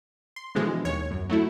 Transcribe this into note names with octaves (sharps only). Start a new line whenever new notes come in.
C6
B2 D3 E3 F3 G#3
D#2 C#5
F#2
F#3 A3 E4